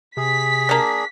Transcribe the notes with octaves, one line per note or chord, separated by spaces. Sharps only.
C3 G#4 B6
A#3 D4